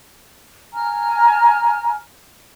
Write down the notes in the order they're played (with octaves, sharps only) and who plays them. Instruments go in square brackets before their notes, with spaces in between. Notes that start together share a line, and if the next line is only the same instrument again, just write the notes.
[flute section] G#5 A#5 F6